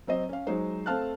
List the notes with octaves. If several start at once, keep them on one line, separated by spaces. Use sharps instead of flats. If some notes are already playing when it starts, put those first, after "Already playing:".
F#3 C4 C5 D#5
C#4 F5
F#3 G#3 D#4 C5
A3 C4 F5 A5 F6 F#6